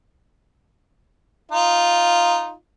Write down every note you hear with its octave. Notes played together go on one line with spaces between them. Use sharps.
D#4 F4